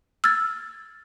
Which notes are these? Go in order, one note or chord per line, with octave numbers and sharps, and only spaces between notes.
E6 F6 G#6 A6